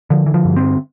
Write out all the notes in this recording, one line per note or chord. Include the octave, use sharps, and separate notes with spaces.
D3 F3
E3
F3
G2
C4